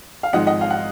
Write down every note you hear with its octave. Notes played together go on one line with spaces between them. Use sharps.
F5
G#1 G#2 F3 G#3 D#5 F#5
D#5 F#5
F5
F#5